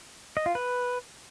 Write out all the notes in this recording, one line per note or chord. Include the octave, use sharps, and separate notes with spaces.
D#5
F4
B4